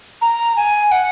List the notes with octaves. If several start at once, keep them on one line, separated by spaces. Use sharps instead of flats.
A#5
G#5
F#5